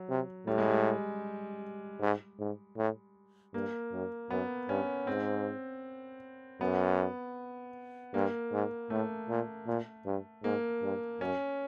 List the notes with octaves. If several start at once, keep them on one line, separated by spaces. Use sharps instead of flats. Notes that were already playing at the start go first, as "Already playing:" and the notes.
Already playing: F#3
C3
A2 G3
G#3
G3
G#2
G#2
A2
G2 A#3
F#2
F#2 B3
G2 C#4
G#2 C4
F#2 B3
G2 A#3
G#2
A2 A3
A#2
A#2
G2
G#2 A#3
G2
F#2 C#4